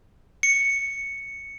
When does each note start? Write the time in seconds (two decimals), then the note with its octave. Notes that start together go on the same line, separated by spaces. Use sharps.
0.43 C#7